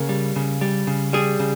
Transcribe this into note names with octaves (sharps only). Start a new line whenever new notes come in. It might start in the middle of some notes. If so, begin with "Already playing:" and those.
Already playing: C#3 A#3
G3
C#3
G3
C#3
G3 G#4
C#3